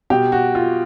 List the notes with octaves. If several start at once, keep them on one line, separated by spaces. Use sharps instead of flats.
B2 G4
F#4
F4